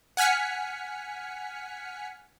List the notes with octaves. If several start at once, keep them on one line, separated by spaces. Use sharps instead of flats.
F#5 G#5 F6 B6 C#7